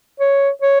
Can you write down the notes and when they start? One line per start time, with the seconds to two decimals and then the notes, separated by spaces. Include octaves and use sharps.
0.20 C#5
0.62 C#5